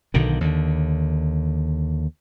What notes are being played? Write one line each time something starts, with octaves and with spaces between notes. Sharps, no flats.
B1 B2 D3 D#3
D#2 D3